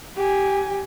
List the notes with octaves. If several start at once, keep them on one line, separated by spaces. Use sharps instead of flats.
G4 G#5